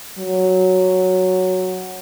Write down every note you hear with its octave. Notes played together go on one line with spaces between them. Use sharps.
F#3